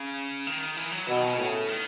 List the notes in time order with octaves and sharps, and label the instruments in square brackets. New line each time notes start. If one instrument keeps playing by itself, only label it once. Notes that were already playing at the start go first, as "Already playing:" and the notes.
Already playing: [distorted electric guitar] C#3
D#3
E3
F#3
[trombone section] B2 [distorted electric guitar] E3
[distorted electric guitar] D#3
C#3
[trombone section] A2
[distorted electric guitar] D#3